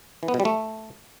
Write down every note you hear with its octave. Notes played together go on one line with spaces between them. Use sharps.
E3
B3
B2
G3
A3